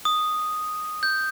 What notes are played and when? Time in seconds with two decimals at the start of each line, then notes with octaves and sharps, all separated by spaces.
0.05 D#6
1.03 G6